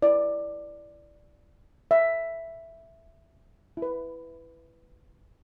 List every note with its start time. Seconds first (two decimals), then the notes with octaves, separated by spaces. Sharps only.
0.02 E4 B4 D5
1.91 E5
3.77 E4
3.82 B4